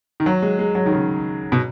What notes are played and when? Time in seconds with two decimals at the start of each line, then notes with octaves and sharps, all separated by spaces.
0.20 D#3
0.26 F#3
0.42 G#3
0.59 G#3
0.75 F#3
0.86 D#3
0.92 C#3
1.52 B2